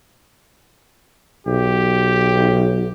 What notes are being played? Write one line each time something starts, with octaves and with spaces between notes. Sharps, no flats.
B1 G4